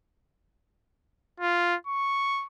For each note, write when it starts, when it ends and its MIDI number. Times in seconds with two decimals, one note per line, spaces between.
1.40 1.75 65
1.87 2.46 85